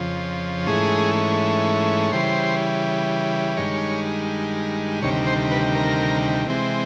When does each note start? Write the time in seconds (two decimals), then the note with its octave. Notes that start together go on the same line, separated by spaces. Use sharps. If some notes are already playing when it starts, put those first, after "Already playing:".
Already playing: F2 C#3 F3
0.67 G#2 E3 A3 C#4 G#4
2.12 C#3 E3 G3 C5
3.57 G2 D#3 G#3 C#5
5.02 D2 C3 D#3 G3 C#5
5.27 C5
5.51 B4
5.75 A#4
6.47 C3 E3 G#3 C4